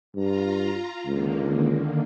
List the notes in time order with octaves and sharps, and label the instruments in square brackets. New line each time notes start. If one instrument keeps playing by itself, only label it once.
[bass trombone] G2 [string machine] F4 A#5
[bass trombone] C#2 [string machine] D3 D#3 A#3